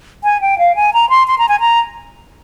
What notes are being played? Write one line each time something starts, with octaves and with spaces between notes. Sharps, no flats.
G#5
G5
F5
G#5
A#5
C6
C6
A#5
G#5
A#5